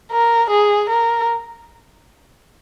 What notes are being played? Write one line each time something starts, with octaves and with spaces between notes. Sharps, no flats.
A#4
G#4
A#4